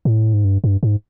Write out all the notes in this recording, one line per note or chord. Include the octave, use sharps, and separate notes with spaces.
A2
G#2
G2
G2
G#2